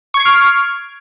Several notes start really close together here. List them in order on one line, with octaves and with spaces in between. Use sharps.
C#6 G#6 C7 D7 F6